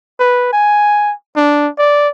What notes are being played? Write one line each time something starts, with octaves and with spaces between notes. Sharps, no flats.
B4
G#5
D4
D5